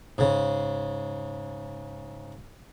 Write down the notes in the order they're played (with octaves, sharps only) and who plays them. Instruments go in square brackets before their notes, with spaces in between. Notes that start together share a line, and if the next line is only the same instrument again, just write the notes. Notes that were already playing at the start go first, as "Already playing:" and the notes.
[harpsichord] G#2 C#3